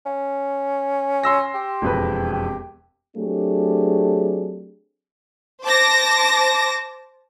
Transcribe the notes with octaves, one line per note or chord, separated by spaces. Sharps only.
C#4
C6 E6 A#6
G4
E1 F2 B4
G4
F#3 A3 C4 D4 G4 G#4
C5 A5 D6 A#6